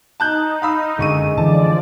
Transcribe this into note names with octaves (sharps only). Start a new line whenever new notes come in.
D#4 A5 F#6 G6
F5 B5 E6
F#1 D3 G#3 C#6 D#7
D3 E3 F3 D5 A5